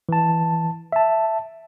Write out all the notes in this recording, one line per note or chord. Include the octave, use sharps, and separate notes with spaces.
E3 A5
E5 A5